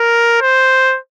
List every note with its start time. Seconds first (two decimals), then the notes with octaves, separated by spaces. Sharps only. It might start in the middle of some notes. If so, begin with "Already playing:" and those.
Already playing: A#4
0.41 C5